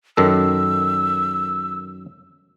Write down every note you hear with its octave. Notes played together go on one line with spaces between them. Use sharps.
F#2 D#3 A4 E6